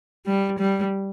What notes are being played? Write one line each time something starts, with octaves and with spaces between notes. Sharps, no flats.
G3
G3